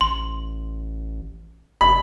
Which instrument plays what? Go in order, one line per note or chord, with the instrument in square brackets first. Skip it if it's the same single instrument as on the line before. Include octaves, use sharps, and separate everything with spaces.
[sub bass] A1 [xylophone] C6
[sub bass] F1 [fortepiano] B5